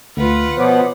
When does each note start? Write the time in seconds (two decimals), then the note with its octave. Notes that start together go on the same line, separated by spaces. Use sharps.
0.17 D2 D3 A3 F4 B4 F#5
0.57 B2 F3 B3 C5 C#5 D6